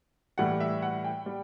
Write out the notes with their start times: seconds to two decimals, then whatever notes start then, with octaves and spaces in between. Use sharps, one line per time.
0.38 A2 E3 G3 F#5
0.60 E5
0.82 F#5
1.04 G5
1.26 G3